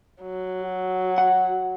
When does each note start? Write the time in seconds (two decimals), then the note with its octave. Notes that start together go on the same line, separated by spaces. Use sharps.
0.22 F#3
0.63 F#4
1.18 F#5